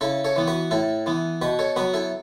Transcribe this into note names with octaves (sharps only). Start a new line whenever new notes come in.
C#3 E4 A4
A4 C#5
E3 B3
F#4 B4
A2 E4 A4
E3 B3
B2 F#4 B4
A4 C#5
F#3 B3 F#4 B4
E4 A4